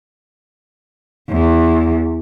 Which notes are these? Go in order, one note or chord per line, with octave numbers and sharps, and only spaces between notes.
E2